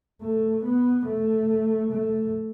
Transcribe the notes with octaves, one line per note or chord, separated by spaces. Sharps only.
A3
B3
A3
A3